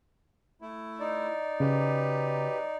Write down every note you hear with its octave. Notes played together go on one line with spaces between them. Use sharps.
A3 E4
D#4 D5
C#3 F#3 G4 B4